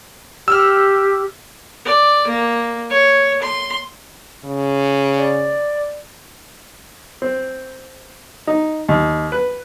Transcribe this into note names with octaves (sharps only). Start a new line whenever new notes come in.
G4 E6 F6
D5
A#3
C#5
C6
C#3
D5
C4
D#4
D#2
B4